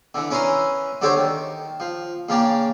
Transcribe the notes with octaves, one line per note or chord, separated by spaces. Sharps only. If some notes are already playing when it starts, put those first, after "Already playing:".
D3 E3
C#4 E4 A#4 B4 C6 D#6
D3 F#4 G4 A4 C5 C#5
D#3
F3
C#3 A#3 D4 G5